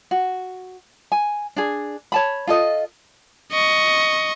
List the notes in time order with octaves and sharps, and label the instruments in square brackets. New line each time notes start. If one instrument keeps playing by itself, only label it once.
[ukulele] F#4
G#5
D4 G#4
C#5 A5 B5
F4 A4 D#5
[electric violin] D#5 C#6